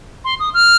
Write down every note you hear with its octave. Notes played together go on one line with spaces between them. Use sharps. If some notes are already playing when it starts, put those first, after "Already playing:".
C6
D#6
F6